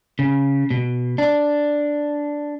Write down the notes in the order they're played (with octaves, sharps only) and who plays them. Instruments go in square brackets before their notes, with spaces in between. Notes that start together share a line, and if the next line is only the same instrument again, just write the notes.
[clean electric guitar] C#3
B2
D4